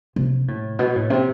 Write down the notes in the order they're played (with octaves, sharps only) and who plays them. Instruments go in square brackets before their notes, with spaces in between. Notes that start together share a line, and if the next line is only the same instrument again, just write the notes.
[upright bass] C3
A2
B2
A2
C3